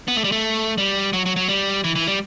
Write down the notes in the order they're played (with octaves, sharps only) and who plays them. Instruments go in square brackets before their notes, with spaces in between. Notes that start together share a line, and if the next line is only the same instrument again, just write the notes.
[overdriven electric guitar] B3
A3
G3
A3
G3
F#3
F#3
F#3
G3
E3
E3
G3